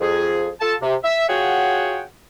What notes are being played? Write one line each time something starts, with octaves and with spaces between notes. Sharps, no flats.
F2 G#4
F4 A4 A5
C3
E5
F4 F#4 G#4 C#5 F#5 G5